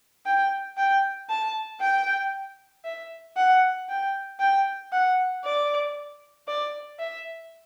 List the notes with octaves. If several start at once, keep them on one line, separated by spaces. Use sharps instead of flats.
G5
G5
A5
G5
E5
F#5
G5
G5
F#5
D5
D5
E5